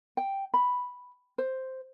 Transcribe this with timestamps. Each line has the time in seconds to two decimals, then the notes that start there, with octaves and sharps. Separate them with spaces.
0.17 G5
0.54 B5
1.38 C5